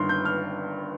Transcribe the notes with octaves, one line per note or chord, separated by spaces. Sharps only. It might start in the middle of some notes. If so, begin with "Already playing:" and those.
Already playing: G1 G2 D#3 C6 F6
G6
F6